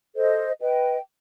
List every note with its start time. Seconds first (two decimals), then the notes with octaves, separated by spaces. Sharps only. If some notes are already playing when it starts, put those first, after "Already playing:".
0.15 A4 C5 D#5
0.61 B4 D#5 G5